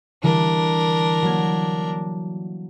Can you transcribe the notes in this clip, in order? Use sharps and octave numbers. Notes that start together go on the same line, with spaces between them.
D3 E3 G3 D4 A#4
F#3 A#3 G#6